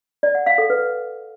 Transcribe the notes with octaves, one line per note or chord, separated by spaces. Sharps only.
D5
F#5
F5
A4
B4